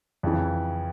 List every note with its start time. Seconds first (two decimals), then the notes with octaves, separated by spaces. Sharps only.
0.23 F2 C#3 E3